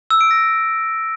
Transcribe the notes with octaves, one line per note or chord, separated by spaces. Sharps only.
E6
D7
A#6